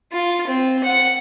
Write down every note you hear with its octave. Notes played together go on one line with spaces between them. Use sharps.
F4
C4
F#5